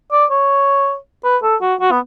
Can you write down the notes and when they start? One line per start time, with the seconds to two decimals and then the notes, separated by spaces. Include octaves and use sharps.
0.12 D5
0.31 C#5
1.24 B4
1.43 A4
1.61 F#4
1.80 F#4
1.91 B3